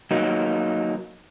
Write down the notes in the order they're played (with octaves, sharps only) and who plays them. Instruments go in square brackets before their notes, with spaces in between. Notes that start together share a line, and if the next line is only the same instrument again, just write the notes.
[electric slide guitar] F#3 A#3 D#4